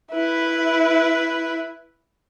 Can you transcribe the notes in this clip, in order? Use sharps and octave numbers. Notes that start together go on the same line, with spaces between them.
E4 B4